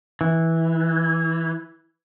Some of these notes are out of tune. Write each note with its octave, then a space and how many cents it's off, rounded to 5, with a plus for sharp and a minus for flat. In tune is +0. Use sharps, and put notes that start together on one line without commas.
E3 -10